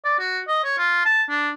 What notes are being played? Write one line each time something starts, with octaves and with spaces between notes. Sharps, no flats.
D5
F#4
D#5
C#5
F4
A5
D4